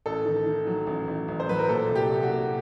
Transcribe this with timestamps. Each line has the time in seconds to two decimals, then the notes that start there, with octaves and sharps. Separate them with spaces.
0.06 A1 A4
0.25 D#3
0.46 D#3
0.67 F#3
0.87 A1
1.08 A1
1.28 A1
1.40 C5
1.48 F#3 B4
1.59 A#4
1.68 A#2 A4
1.89 C2
1.95 G4
2.09 C2
2.23 F#4
2.30 A#2